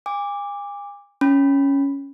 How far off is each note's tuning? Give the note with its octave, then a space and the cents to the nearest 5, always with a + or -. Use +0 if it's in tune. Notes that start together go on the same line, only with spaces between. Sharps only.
G#5 -40 D6 +0
C#4 +0 B5 +0